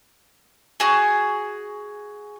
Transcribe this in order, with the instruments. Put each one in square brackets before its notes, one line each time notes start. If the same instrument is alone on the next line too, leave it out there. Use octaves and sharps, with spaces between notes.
[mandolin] F#4 G#4